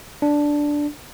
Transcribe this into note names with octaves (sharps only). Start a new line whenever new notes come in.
D4